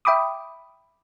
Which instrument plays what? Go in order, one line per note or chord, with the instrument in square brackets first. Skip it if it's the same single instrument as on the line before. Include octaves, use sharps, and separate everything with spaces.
[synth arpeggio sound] E5 G5 B5 D6 D#6